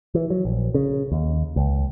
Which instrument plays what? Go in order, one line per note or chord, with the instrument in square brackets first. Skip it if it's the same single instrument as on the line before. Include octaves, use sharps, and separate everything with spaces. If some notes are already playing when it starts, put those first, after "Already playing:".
[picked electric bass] E3
F#3
A#1
C#3
D#2
C#2